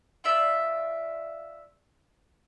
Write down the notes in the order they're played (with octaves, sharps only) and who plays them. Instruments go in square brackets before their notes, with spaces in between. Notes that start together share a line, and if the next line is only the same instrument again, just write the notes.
[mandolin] F4 D5 E5